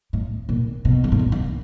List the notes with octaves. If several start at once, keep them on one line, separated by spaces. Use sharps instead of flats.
A2
A#2
B2
G#2
A2
A#2
D3
D#3